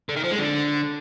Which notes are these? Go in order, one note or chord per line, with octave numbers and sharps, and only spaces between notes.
D3
D#3
F3
G#3
D3